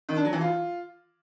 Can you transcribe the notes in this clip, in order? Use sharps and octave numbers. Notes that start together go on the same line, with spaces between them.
D#3
D4
F#3
E3
F4